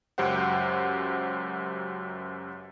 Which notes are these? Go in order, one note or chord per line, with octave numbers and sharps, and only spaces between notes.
C#2 F#2 G4 C5 F#5